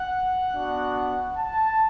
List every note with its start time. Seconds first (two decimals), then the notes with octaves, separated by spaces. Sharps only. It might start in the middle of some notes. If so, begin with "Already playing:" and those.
Already playing: F#5
0.55 B3 D4 F#4
1.37 A5